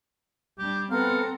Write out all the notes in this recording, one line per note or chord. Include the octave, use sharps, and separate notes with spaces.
G3 D4 G4
B3 C4 A4 F5 F#5 A#5